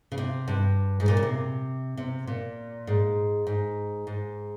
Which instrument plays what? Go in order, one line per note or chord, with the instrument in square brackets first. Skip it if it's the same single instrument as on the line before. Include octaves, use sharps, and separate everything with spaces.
[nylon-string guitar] C#3
C3
G2
G#2
A#2
C#3
C3
C3
A#2
G#2
G#2
G#2